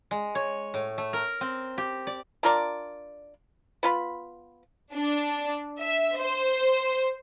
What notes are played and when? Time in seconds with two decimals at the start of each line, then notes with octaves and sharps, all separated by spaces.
0.11 G#3
0.35 C#5
0.74 A2
0.98 A3
1.13 A#4
1.41 C4
1.78 G4
2.07 D5
2.43 D4 F4 A#4 D5
3.83 B3 F4 B5
4.93 D4
5.79 E5
6.17 C5